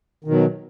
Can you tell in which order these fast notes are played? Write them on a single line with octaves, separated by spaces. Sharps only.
D#3 B2 F#3